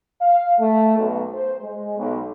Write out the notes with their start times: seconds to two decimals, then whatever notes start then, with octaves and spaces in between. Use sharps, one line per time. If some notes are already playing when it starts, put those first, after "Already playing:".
0.21 F5
0.58 A3
0.97 B1
1.33 C5
1.62 G#3
1.98 B1